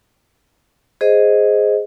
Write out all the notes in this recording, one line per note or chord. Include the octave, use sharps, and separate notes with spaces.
G#4 C5 D#5